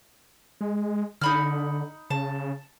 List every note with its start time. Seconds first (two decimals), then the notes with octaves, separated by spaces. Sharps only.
0.61 G#3
1.21 D3 D#4 B5 F6
2.10 C#3 A5